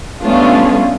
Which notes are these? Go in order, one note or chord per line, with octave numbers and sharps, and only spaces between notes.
G3 A3 B3 C#4 D4 F4